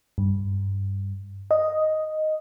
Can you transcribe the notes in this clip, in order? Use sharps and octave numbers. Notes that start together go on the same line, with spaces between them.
G2
D#5